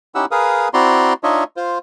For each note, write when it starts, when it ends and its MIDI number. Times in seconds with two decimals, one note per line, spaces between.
0.15 0.25 61
0.15 0.25 63
0.15 0.25 64
0.15 0.25 67
0.15 0.25 78
0.15 0.25 88
0.31 0.68 68
0.31 0.68 70
0.31 0.68 71
0.31 0.68 77
0.31 0.68 87
0.74 1.13 60
0.74 1.13 64
0.74 1.13 66
0.74 1.13 74
0.74 1.13 82
0.74 1.13 84
1.23 1.44 62
1.23 1.44 63
1.23 1.44 65
1.23 1.44 73
1.23 1.44 75
1.23 1.44 76
1.57 1.78 65
1.57 1.78 72